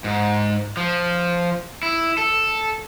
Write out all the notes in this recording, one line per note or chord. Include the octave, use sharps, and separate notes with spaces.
G#2
F3
E4
A4